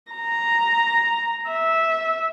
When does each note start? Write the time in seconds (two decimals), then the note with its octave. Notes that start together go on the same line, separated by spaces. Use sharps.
0.12 A#5
1.49 E5